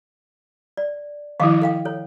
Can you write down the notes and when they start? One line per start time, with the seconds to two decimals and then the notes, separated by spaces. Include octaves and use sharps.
0.77 D5
1.40 D#3 F3 E4 D#5 F5
1.62 A4 F5 G5
1.85 A4 C#5